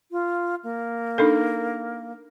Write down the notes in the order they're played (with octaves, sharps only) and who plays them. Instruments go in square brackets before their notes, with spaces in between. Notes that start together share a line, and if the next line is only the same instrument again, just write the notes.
[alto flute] F4
A#3
[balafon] D4 D#4 A4